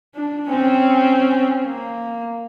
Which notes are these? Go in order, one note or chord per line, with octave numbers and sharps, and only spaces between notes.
D4
C4 C#4
A#3